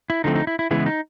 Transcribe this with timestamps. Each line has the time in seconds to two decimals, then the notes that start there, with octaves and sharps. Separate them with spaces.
0.10 E4
0.24 D3 F3 A3 C4 D#4
0.36 D#4
0.47 E4
0.59 E4
0.71 C#3 E3 G#3 B3 E4
0.86 D#4